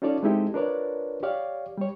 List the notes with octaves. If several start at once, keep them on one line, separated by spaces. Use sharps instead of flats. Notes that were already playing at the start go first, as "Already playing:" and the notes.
C#4 D#4 F4 A4 C#5 D5
G#3 C4 D#4 E4 G4 A4
D4 F4 A#4 B4 C#5 D5
G4 C#5 D5 F5
G3 C#5